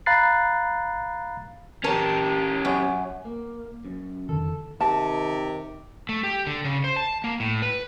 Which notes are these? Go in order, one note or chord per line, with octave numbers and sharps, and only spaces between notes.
F5 A#5 B5 F#6 A6 C7
C#4 G4 A#4 A5
F#2
A#3
F#2
F2 D3 D#3 A4
C3 D#3 A5
A3
G4
D3
C#3
C5
A5
A#3
A2
B4